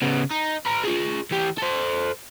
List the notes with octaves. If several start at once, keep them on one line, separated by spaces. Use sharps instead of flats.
C#3 B3
D#4
B4 A#5
F4 G#4
E3 G4
A4 C5